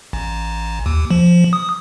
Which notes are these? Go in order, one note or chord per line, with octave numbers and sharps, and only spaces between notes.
A1
D#2
F3
D#6